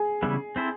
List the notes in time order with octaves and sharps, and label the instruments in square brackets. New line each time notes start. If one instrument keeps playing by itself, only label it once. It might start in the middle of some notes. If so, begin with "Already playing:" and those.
Already playing: [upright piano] G#4
[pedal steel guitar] C#3 E3 G3 B3 E4
C4 E4 A4 C5